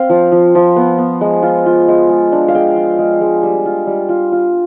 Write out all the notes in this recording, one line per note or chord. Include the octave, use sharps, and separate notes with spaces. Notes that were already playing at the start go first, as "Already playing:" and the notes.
Already playing: C4 F5
F3
F3
F3
B3
B3
G#3
F4
F4
G#3
G#3
D4
F5
G#3 G5
F4
G#3
G#3
G3
F4
G3
F4
F4